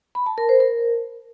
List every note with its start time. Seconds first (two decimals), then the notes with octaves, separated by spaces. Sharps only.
0.15 B5
0.26 A5
0.38 A#4
0.49 C5
0.60 A#4